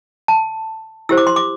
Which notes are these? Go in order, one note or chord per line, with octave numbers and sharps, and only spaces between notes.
A5
E4 G4 C5 E6
D6
C6
D6